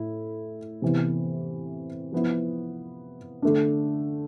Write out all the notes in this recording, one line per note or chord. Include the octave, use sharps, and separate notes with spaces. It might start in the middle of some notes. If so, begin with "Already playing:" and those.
Already playing: A2 E4
C3 E3 B3
F3 B3 E4
D3 A3 D4